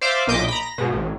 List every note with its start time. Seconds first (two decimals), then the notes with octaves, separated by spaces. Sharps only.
0.01 C5 D5 E5 F5 D6
0.27 B1 A#2 D#5 D6 G6 B6
0.48 A#5 B5
0.63 A#6
0.78 G#2 B2
0.92 A1